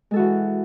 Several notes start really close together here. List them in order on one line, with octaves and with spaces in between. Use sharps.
G#3 A4 F#4 E3